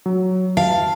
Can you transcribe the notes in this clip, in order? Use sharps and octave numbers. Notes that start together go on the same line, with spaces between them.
F#3
F5 A5